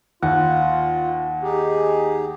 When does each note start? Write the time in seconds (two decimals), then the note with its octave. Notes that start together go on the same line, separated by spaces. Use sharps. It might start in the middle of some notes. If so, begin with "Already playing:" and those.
0.23 D#2 F4 F#5
1.43 D#4 G4 G#4